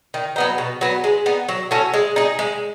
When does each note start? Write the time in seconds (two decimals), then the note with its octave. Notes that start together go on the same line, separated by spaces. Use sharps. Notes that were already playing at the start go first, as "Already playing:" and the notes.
0.14 D#3
0.36 F#3 B3 D#4
0.58 B2
0.81 F#3 B3
1.04 G#3
1.26 B3 D#4
1.49 F#3
1.71 C#4 F#4 A4
1.94 G#3
2.16 D#4 G#4
2.39 G#3